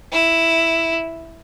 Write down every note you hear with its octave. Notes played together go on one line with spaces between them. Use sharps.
E4